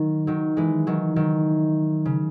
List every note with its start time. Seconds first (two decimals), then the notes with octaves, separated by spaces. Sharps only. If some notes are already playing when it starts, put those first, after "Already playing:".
Already playing: D#3 F#3
0.27 D#3 F#3
0.57 E3 G#3
0.87 D#3 F#3
1.16 D#3 F#3
2.05 C#3